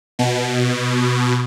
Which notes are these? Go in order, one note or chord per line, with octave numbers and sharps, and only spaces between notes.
B2